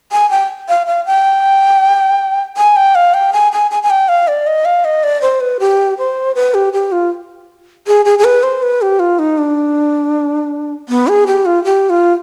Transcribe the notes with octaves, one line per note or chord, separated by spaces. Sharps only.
G#5
G5
F5
F5
G5
G#5
G5
F5
G5
G#5
G#5
G#5
G#5
G5
F5
D5
D#5
F5
D#5
D5
C5
B4
G4
C5
B4
G4
G4
F4
G#4
G#4
G#4
B4
C5
B4
G4
F4
D#4
D4
B3
G#4
G4
F4
G4
F4